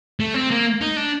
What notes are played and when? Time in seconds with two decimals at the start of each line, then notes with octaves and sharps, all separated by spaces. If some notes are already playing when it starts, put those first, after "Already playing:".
0.20 A3
0.34 C4
0.51 A#3
0.81 D#4
0.96 D4